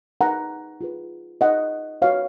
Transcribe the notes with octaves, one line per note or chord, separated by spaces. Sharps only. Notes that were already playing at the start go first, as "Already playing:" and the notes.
D#4 G#4 B4 F#5 A#5
F4 G#4 B4
D#4 G#4 B4 D#5 F#5
F#4 B4 C#5 F5